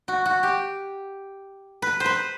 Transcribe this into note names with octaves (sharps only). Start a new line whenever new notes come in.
F#4
F#4
G4
B4
C5
B4